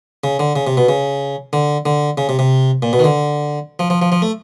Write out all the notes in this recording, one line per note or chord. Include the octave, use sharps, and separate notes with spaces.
C#3
D3
C#3
C3
B2
C#3
D3
D3
C#3
C3
C3
A#2
B2
D#3
D3
F3
F3
F3
F3
A3